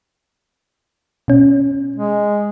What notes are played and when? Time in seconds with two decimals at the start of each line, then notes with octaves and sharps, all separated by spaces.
1.28 B2 C#4
1.96 G#3